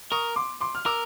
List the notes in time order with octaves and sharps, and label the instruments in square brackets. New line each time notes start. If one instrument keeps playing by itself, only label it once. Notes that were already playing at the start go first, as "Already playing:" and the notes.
[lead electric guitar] A#4 [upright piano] C#6 D#6
[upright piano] C6 D6
C6 D6
F6
[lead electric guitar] A#4 [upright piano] D6 E6